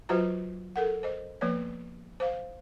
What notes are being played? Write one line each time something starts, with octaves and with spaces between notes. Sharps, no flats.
F#3 F4 F#4 B4 C5 A#5
A4 A#4 F#5
C5 D#5
F3 A#3 B3 B4 C#5
C5 F5